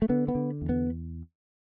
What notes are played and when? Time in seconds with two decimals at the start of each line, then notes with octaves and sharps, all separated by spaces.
0.02 A3
0.09 D3 B3
0.28 B3
0.35 D3
0.62 E2
0.69 B3